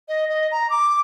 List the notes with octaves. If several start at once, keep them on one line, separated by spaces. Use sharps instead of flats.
D#5
D#5
A#5
D6